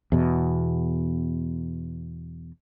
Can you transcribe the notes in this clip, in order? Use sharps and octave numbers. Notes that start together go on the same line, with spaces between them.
E2 B2